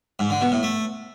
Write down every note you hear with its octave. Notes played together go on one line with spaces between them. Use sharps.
G#2
D3
B2
A2
A3